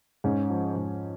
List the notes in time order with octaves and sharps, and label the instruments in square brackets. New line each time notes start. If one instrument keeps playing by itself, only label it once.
[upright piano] G#2 C#4
F3
G#2